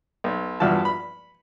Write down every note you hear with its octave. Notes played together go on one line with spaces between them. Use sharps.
B1
E2 G2 F3 F#4 A5
B5